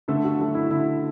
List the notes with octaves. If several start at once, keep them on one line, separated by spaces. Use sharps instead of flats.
D3 A3 A4
F#4
F#3 A3
E4
D3 E4